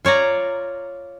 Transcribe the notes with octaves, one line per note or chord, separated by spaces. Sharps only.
F4 C#5 D5 A#5